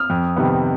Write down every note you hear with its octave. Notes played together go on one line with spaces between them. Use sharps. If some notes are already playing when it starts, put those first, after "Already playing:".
Already playing: D#6 F6
F2
C3 D#3 G3 B3